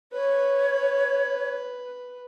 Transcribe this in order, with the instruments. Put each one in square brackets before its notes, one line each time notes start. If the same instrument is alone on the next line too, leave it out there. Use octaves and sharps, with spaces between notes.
[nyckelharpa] B4 [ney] C#5